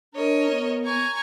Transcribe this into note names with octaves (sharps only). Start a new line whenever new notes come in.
D4 A#4 C#5 D#5
B3
G#5 A#5 C#6